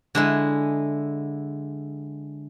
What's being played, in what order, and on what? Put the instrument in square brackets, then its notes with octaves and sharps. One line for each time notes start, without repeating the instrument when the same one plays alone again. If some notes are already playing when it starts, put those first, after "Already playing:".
[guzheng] D3 G#3 E4